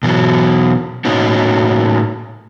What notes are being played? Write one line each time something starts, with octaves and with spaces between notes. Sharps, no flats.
B2 E3 F#3
A2 A#3 C#4 D#4 F#4